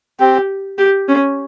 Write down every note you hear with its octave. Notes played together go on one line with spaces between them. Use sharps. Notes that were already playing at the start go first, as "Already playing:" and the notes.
C4 G4
G4
C#4